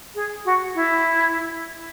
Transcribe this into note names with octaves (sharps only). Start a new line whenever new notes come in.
G#4
F#4
E4